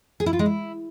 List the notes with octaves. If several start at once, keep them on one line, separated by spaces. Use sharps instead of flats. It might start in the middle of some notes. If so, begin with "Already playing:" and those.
G#4
E4
F4
G#3
E4